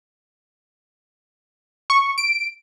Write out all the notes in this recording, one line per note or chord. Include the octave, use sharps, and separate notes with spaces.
C#6
D7